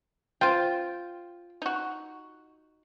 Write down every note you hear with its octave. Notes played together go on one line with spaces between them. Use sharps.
F4 C5 G5
D#4 F#4